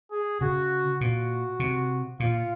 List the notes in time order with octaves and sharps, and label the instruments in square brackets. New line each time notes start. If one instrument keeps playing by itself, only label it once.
[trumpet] G#4
[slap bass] C#3 [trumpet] F#4
[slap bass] A#2 [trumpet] F#4
[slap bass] C3
[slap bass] A#2 [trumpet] F4